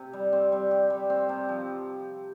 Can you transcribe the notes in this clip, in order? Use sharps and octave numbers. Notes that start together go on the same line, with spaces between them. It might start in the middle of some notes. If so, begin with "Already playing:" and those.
Already playing: C3
G3
C4
G3
G4
G3
C4
C3
F3